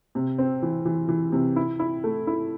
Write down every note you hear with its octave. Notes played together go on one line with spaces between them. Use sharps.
C3
C4
E3
E3
E3
C3
E4
E4
A3
E4